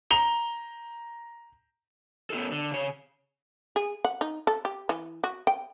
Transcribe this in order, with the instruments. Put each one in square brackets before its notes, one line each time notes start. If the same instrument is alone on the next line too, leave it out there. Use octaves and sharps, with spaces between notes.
[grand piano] A#5 F7 G7
[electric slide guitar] B3 C#4 F4 G4 A4
D3
C#3 C#5
[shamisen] G#4
F#5
D#4
A4
G4
E3
F#4
G5